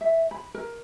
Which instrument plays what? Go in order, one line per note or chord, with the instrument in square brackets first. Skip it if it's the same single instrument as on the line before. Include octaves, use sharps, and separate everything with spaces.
[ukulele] E5
B5
A#4